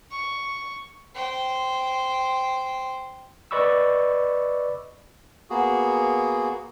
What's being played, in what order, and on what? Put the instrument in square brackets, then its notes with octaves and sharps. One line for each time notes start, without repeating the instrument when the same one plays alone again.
[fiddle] C#6
[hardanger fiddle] C5 G5
[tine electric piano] B4 D5 D#5 B5 C#6 E6
[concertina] A#3 B3 F#4 G#4